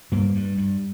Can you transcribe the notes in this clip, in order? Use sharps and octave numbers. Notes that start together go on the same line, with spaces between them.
G2 G3 A#3
G2
G2